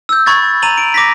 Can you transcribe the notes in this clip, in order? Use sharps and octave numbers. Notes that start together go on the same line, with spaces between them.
E6 G6
B5 C#6 G#6 A6
A#5 D#7 F7 F#7
D7
D6 A#6 B6